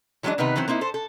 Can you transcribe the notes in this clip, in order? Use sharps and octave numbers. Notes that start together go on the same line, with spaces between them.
E3 F#3 G#3 A3 D4 D#5
C3 D#3 B3 D#4 B4
D#3 E3 F#3 C4
A#3 C4 D#4 E4
A4 C5
A4